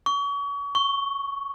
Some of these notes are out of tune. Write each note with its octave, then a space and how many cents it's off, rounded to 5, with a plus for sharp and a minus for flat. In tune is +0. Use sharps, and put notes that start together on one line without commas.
C#6 +35
C#6 +0